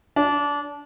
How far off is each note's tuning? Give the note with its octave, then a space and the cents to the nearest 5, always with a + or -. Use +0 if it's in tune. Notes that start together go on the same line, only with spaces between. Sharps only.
D4 -25